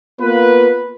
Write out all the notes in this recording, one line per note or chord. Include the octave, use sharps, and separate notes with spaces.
A#3 B3 F4 B4